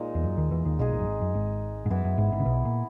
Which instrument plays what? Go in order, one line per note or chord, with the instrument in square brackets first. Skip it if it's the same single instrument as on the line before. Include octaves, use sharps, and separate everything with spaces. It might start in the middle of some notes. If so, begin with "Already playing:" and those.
Already playing: [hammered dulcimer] A#2 G#3 D#4
[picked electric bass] E2
F#2
D#2 D#3
E2 E3
D#2 D#3
[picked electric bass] B1 B2 [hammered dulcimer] G#3 D#4 G#4
[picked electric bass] A#1 A#2
F#2
G#1 G#2
F#2
G#1 G#2
G#2
[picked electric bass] F#2 [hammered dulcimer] E3 B3 E4
[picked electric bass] F#2
G#1 G#2
G#1 G#2
C#3
B1 B2
A#2